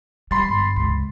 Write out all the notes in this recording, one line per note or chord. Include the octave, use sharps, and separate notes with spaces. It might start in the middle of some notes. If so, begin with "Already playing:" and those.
G3 B5 C6 A6
G1
C#2 C3